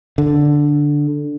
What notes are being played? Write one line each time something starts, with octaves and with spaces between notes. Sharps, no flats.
D3